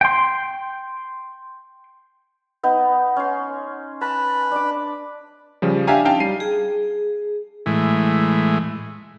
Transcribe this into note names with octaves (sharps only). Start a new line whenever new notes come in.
G5 C6
B3 D#4
C#4 C6
B4 A5 B5
D4 D6
C#3 F3 G3
D4 G4 E5 F5 G#5 A#5
C#4 D#4 F5 G5 A5
G3 C7 D#7
G#4
A2 E3 G#3